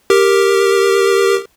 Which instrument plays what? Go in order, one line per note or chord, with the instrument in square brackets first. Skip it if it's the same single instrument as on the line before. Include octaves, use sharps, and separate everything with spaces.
[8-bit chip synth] G4 A#4